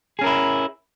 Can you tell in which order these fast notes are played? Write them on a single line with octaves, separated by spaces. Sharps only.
G#4 C#4 A#4 E4